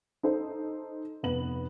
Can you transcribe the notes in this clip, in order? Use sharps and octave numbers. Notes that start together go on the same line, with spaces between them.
D#4 A4 C5
F1 B3 F#7